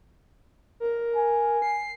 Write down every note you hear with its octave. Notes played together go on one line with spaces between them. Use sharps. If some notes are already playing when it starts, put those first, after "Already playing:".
A#4
G#5
C7